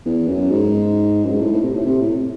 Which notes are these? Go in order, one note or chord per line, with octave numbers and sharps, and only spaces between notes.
E2
F#2
G#2
F#2
G#2
A2
A2
C3
A2
C3
A2